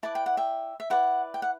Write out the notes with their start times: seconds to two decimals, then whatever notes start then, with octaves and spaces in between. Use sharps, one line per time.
0.03 E4 B4 D5 A5
0.15 G5
0.26 F#5
0.37 E5 G5
0.80 E5
0.90 E4 B4 D5 F#5
1.34 G5
1.42 F#5